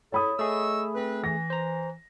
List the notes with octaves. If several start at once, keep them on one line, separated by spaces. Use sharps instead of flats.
E4 A4 C#5 B5 D#6
A3 G#4 D#5 C#6 E6
C4 B4
E3 A#6
C5 A#5